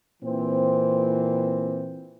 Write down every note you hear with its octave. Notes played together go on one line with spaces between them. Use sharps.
A#2 E3 C4